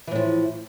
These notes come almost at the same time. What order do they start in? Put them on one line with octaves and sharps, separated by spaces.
E3 A2 F3